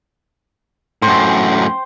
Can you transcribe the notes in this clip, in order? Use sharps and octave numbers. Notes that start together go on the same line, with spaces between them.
F#2 A2 C5 G5